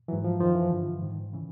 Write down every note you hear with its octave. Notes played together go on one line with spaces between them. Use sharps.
G#2 E3 F#3
F3
F#2 D#3 F3
E3
G2 D3
G#2 D#3
C#3 E3